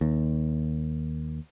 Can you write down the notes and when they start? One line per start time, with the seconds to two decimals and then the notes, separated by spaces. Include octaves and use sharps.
0.01 D#2